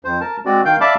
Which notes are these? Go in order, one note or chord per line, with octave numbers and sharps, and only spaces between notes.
F2 C5
A#4 A5
G#3 C4 F#4 D5
D#3 F5 G5 G6
D5 E5 F5 A5 B5 D6